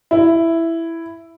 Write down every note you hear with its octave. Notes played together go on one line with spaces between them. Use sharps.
E4